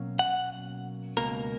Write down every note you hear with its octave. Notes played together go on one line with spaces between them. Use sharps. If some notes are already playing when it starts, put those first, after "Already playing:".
Already playing: B2 F#3 A#3 C#4
F#5
C#2 B2 A#3 A#4